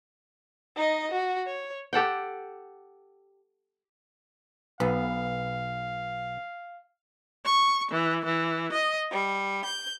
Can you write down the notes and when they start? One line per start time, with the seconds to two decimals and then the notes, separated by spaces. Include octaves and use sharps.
0.76 D#4 D#5
1.11 F#4
1.46 C#5
1.93 G4 A4 F#5 G5
4.80 B1 B3 F5
7.45 C#6
7.91 E3
8.26 E3
8.73 D#5
9.11 G3
9.65 G6